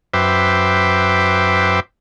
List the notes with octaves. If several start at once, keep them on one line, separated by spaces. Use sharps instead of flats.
F#2 B4 C5 E5 G5 D6